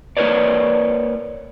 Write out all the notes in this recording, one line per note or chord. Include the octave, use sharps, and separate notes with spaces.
A#3 E4 A#4 B4 C#5 D5